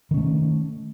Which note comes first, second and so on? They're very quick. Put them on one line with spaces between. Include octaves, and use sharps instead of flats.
D#3 C#4 A3